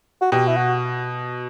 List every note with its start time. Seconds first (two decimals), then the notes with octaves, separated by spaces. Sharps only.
0.22 F#4
0.32 B2 G4
0.47 E4
0.56 F#4